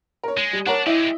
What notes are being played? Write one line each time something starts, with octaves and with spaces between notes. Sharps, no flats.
A#4 C#5
G#3 D#7
G3
D4 A#4 C#5 F#5
G#3 E4 G4 D#5 E5